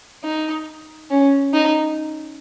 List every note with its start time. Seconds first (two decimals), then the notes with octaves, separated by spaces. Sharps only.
0.24 D#4
1.10 C#4
1.54 D#4